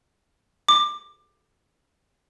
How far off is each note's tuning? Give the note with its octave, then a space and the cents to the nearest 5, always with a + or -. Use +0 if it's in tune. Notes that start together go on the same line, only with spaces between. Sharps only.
D6 +20